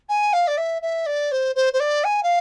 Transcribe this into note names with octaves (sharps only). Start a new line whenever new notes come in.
G#5
F5
D5
E5
E5
D5
C5
C5
C5
D5
G#5
F5